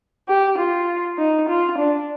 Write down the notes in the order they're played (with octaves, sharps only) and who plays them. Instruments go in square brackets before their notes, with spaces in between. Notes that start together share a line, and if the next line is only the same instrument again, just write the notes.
[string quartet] G4
F4
D#4
F4
D4